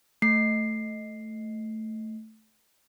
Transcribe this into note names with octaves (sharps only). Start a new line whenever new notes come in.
A3 C7